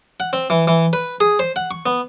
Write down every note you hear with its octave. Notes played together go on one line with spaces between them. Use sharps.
F#5
C4
E3
E3
B4
G#4
C5
F#5
C#6
B3